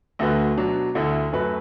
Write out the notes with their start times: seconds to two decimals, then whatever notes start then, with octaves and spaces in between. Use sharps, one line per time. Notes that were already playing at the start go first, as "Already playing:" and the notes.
0.19 D2 D3 A3 F#4 B4
0.57 B2 F#3 D4
0.95 D2 D3 A3 E4
1.33 F#2 F#3 A3 F#4 B4